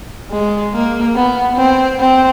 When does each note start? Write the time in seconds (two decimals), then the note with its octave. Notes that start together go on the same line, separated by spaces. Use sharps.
0.31 G#3
0.74 A#3
1.16 B3
1.57 C4
2.00 C4